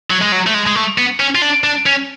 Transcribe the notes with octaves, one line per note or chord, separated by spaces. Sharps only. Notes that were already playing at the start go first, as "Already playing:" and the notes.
F#3
G#3
F#3
A3
G#3
G#3
A3
B3
C#4
F4
D4
D4
C#4